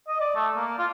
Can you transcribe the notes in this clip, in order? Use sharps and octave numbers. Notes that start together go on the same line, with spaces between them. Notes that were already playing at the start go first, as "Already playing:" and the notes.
D#5
D5
A3
A#3
F4